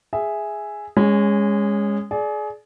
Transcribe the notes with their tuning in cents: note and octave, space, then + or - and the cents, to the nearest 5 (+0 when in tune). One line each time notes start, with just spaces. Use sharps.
G#4 +0 E5 +0
G#3 -20 C#4 +0
G#4 +30 D5 +0